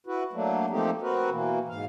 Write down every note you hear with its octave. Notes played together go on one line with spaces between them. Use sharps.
E4 F#4 B4
F#3 A3 A#3 D4
F3 A3 A#3 C4 D#4 G4
C4 F#4 A#4 B4
B2 E3 A#3
G#2 F5